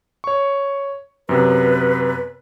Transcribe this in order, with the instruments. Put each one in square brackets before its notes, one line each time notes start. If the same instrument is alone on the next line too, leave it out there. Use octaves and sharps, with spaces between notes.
[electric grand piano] C#5 C#6
[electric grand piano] F#2 C3 B3 [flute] B4